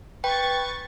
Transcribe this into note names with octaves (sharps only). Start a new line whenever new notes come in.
B4 G5 C#6 A6